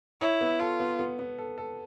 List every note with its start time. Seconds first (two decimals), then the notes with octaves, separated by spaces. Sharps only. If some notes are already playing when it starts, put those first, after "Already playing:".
0.21 E4 C#5
0.41 B3
0.60 F4 A4
0.80 B3
0.99 B3
1.19 B3
1.38 A4
1.58 A4